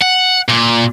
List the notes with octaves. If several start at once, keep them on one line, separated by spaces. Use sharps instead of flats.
F#5
A#2